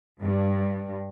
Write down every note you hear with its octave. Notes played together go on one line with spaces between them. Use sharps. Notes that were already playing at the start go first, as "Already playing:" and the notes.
G2